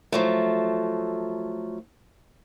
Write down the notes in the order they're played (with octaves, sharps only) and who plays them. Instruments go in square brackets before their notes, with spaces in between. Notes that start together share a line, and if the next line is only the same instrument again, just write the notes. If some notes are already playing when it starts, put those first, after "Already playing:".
[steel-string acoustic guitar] F3 F#3 A3